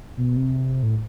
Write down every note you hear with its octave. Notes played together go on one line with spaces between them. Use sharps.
B2
C3
A2